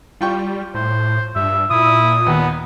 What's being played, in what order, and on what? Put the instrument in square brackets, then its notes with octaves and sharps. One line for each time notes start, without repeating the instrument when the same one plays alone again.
[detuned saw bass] G3 [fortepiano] F4 G5 C#6
[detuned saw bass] A2 [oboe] C5
[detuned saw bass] G2 [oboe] E5
[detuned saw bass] A#2 [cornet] E4 [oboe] D#6
[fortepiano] D#2 [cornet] B3